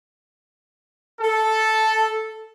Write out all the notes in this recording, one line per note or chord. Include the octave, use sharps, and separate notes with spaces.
A4